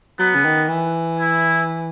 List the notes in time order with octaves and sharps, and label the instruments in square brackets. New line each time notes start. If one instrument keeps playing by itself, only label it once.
[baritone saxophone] F#3 [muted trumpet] B3
[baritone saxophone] C#3
D#3
E3
[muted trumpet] E4